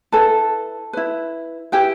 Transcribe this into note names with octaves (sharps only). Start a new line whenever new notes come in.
E4 A4 B4 A5
E4 B4
E4 G4 B4 G5